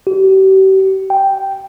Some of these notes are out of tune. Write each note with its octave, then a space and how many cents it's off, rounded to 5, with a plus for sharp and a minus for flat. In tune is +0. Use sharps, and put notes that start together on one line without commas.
G4 -40
G5 -5